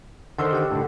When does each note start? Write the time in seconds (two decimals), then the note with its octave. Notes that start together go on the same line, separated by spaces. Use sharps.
0.38 D3 D#3 C5 F#5 C6 E6
0.53 G4 F#5 E6
0.71 A2 D3